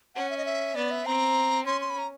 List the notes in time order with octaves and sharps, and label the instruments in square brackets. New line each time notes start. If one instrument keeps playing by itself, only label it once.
[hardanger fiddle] C#4 [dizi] F#5
[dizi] E5
D#5
E5
[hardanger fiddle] B3 [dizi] D5
[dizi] E5
[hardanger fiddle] C4 [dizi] A#5
[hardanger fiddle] C#4 [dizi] C6
[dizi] C6
B5
A#5